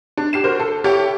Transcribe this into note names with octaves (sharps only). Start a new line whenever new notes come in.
D4
G4 C7 E7
F#4 A#4 C5
A4
E4 G4 A4 C#5 G5